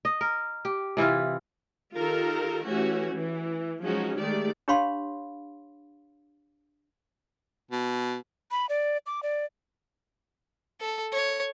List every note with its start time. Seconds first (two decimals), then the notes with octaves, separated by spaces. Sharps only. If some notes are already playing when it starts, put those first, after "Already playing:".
0.05 D#5
0.21 A#4
0.65 G4
0.97 C3 E3 E4 F4
1.95 D#3 F4 G4 A4 A#4
2.64 E3 A3 C#4 F#4 G4
3.13 E3
3.83 F3 F#3 G#3 C#4 D#4 F#4
4.18 D#3 G#3 A3 G4 G#4 D5
4.68 D4 G4 C#5 F5 B5 C6
7.71 B2
8.51 B5
8.69 D5
9.06 D6
9.23 D5
10.81 A4
11.12 C#5